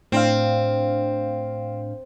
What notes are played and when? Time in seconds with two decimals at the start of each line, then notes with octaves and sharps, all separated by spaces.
0.12 A2 C4 D4 F5